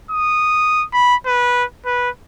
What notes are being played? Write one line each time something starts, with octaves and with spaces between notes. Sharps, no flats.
D#6
B5
B4
B4